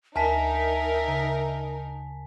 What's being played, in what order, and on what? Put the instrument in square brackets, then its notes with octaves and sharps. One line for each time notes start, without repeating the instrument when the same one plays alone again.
[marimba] D2 [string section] D#4 A#4 [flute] E5 [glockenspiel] G#5 A5 B6
[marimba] C#3